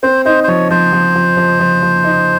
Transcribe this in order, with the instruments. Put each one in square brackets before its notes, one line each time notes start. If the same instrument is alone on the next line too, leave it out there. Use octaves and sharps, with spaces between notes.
[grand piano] C4 [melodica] C5
[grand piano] D#4 [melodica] C5
[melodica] C5
[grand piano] F3 [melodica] C#5
[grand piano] F3 [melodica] C5
[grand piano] F3
F3
F3
F3
F3
D#4